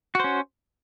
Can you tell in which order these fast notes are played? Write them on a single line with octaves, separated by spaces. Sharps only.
F#4 C5 C#4